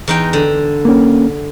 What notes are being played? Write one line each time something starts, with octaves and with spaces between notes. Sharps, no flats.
E2 D#4 G5
D3
A#3 C#4